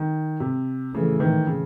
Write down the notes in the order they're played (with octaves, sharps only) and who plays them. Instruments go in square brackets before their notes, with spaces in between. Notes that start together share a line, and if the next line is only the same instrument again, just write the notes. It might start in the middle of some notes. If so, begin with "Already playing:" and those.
Already playing: [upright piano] D#3
C3
[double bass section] A2 E3 A3 [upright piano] C#3
[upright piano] D#3
C#3